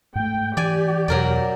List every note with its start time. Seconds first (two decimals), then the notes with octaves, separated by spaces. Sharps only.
0.15 G#2 A3 G5
0.57 E3 G4 D5 G#5
1.08 E2 B2 F#3 A#4 D5